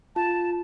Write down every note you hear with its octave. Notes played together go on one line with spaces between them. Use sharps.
F4 A5